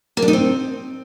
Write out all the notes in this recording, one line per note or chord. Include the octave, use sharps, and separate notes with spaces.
A#3
D4
D#4
C4